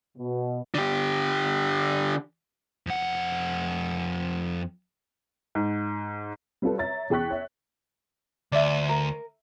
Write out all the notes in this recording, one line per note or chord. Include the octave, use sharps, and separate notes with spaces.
B2
D3 G4
F2 F#5
G#2
G3 C4 F4 A4 B4
C#5 E5 A#5 A6
E2 G#4 G5 C#6 F#6 B6
C#5 E5
D2 D5 E5
A#4